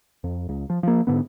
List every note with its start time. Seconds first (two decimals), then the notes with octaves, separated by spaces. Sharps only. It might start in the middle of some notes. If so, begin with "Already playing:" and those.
0.24 F2
0.49 C#2
0.70 F3
0.83 F3 A#3
1.07 G#2 D3 B3